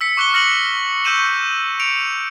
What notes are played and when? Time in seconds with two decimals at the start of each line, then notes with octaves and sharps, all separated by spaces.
0.01 E6 B6 C#7
0.17 C#6 D6 F#6 C#7 G7
0.34 F6 A#6 C#7 F#7
1.04 C#6 E6 G6 D#7 E7 F#7
1.80 C#7 D7 F7